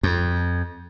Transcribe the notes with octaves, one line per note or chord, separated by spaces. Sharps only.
F2